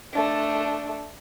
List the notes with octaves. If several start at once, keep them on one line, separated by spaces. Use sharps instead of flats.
A3 D4